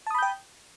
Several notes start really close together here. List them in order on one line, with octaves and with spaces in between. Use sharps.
A5 D#6 B5 G6 G5